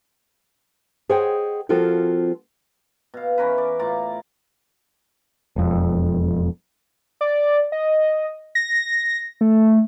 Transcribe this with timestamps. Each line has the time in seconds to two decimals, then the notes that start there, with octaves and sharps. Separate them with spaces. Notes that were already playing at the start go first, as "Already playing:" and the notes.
1.09 G#4 C5 C#5 D#5 F#5 G5
1.69 F3 C4 F4 F#4 A4 A#4
3.14 B2 F5
3.38 E3 C#4 A#4 B4
3.58 D5
3.79 A2 F4 D5 A#5
5.56 E1 F2
7.21 D5
7.72 D#5
8.55 A#6
9.41 A3